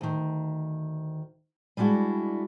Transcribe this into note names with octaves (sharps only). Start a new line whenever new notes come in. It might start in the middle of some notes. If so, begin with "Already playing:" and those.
D2 D#3
G3 G#3 D4 E4 F#4